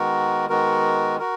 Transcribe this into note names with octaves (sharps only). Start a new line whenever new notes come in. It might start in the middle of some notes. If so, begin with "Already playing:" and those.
Already playing: D#3 G#3 B3 F#4 A#4
D#3 G#3 B3 F#4 A#4
F#4 A#4